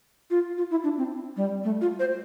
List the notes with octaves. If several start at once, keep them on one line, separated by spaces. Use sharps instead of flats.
F4
F4
E4
D4
C4
G3
A3
F4
C5